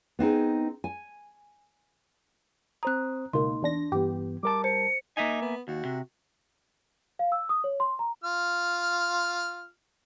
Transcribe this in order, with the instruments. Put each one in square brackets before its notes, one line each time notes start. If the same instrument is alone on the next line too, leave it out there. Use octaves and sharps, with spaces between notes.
[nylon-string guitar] B3 C4 D#4 G#4
G#5
[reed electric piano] C4 C5 D#6 [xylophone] A#5 F#6
[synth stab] C#2 B2 A#3 [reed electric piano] D#4 [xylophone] C6
[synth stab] E2 D4 A#6
[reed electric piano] G2 E3 B3 [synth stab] G4
[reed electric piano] G3 A#4 A5 [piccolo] D6
[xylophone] C5 [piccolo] C#7
[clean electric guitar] A#3 E5 G#5 [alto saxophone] D#4
[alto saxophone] B3
[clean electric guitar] D#2 [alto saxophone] F#4
[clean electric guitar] C3
[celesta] F5
E6
D#6
C#5
C6
A#5
[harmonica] F4 F6